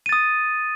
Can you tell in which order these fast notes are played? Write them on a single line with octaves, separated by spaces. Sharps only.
D#7 A6 D#6